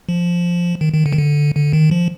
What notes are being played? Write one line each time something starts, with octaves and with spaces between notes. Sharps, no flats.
F3
D#3
D#3
D3
D#3
D3
D3
D#3
F3